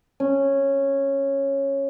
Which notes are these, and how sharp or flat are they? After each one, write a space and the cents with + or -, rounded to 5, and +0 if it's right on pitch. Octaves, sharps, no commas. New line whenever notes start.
C#4 -10